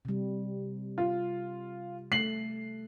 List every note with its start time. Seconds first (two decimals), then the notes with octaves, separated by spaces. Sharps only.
0.05 C3 G3
0.98 F4
2.12 A3 C7 F#7